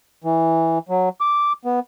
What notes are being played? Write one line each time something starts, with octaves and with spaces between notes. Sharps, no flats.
E3
F#3
D6
B3